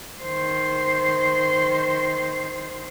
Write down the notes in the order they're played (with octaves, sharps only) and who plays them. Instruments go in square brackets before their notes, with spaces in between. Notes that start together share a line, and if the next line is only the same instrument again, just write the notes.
[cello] D#3 C5